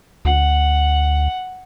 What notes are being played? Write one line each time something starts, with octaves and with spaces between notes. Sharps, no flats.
D2 F#5